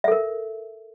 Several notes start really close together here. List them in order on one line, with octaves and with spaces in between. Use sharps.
E5 A4 A#4